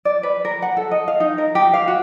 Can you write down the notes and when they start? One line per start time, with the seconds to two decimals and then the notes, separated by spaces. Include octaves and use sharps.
0.05 D5
0.23 B4
0.45 A#4
0.62 F#5
0.77 A4
0.91 D#5
1.08 F5
1.20 D#4
1.38 A#4
1.55 G4
1.74 F5
1.88 F#4